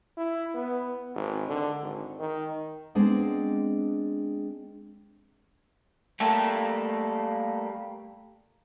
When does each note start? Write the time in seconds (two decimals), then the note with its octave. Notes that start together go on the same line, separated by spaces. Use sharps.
0.17 E4
0.55 B3
1.15 G#1
1.48 D3
1.82 G#1
2.19 D#3
2.95 G#3 B3 C4 D4 G#4 D#5
6.20 G3 A3 A#3 G4 A4